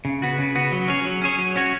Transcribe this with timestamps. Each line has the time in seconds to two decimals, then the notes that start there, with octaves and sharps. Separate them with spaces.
0.05 C#3
0.22 B3 F#4
0.38 C#3
0.55 B3 F#4
0.72 F#3
0.88 C#4 G#4 C#5
1.05 F#3
1.21 C#4 G#4 C#5
1.38 F#3
1.56 C#4 F#4 C#5